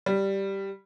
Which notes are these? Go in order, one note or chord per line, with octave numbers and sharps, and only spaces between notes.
G3